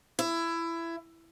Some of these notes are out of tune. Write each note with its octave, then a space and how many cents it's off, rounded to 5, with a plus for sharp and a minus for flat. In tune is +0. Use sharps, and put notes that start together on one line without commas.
E4 +20